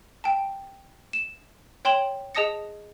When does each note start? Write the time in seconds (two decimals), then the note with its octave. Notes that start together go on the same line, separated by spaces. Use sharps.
0.24 G5 A5
1.13 E7
1.85 C#5 G5 C6 E7 F#7
2.35 G#4 D#5 A5 D#6 A#6 C#7